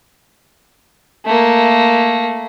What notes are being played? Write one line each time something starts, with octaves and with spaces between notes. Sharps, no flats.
A3 A#3